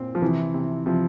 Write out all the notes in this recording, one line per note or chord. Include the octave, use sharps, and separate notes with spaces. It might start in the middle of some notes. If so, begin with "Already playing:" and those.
Already playing: A#2 C4
F3
C3 E3
C3
C3 F3